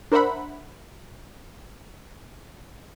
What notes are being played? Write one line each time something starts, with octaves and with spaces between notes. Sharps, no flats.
D4 A#4 C5 E5 F#5 B5